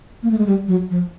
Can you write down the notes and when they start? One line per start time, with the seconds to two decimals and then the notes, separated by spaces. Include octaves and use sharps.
0.23 A#3
0.31 A3
0.38 G#3
0.46 G3
0.68 F#3
0.90 F3